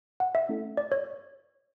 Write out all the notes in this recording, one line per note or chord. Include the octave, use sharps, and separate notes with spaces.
F#5
E5
A3 C#4 E4 A4
D5
C#5